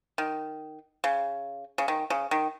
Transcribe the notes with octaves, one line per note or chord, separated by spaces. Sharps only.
D#3
C#3
C#3
D#3
C#3
D#3